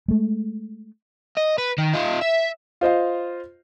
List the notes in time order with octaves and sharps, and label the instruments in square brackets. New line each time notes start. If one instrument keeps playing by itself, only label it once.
[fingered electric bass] G#3 A3
[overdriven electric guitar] D#5
B4
D#3
D#4 F4
E5
[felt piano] F4 C5 D#5 F5